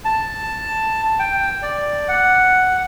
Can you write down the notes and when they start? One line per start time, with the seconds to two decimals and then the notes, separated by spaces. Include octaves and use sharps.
0.05 A5
1.19 G5
1.62 D5
2.09 F#5